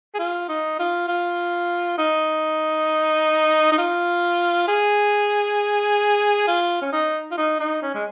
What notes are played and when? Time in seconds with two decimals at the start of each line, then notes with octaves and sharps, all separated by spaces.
0.14 G#4
0.19 F4
0.49 D#4
0.79 F4
1.08 F4
1.98 D#4
3.72 D#4
3.78 F4
4.68 G#4
6.47 F4
6.81 C#4
6.92 D#4
7.31 F4
7.37 D#4
7.60 D#4
7.82 C#4
7.94 G#3